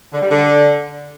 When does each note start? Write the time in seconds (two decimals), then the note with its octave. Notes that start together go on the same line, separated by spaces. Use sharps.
0.13 D3
0.22 G3
0.30 D3